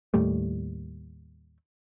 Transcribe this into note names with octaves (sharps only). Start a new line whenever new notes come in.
D#2 A2 G3 A3